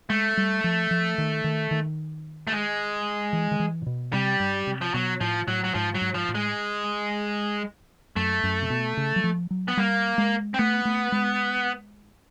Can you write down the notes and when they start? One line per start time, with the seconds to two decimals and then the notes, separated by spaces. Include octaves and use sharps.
0.10 G#3 A3
0.37 G3
0.64 F3
0.91 F3
1.18 D#3
1.44 D#3
1.71 D#3
2.47 A3
2.52 G#3
3.33 E3
3.51 D#3
3.60 E3
3.82 A#2
3.86 B2
4.13 C3 G3
4.40 G2
4.67 C3
4.81 F3
4.94 B2 F#3
5.21 A2 F3
5.47 A2 F#3
5.64 F#3
5.74 G#2 F3
5.95 F#3
6.01 G#2
6.14 F3
6.29 A2
6.35 G#3
8.16 F#2 A3
8.44 F#2
8.62 C3
8.70 B2
8.97 C#3
9.16 F#3
9.24 F3
9.51 F#3
9.68 B3
9.77 G3 A#3
10.18 G#3
10.54 C4
10.59 A3 B3
10.85 A3
11.12 G#3